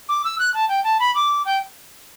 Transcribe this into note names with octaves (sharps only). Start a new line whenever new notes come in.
D6
E6
F#6
A5
G5
A5
B5
D6
G5